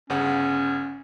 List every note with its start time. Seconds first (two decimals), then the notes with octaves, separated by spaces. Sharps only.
0.10 G1 C#3 C#4 F#5